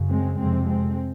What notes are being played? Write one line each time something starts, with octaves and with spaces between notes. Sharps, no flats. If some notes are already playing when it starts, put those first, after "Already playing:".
Already playing: F#2 C#3
G#3 C4
F2 C3 G#3 C4
G#3 C4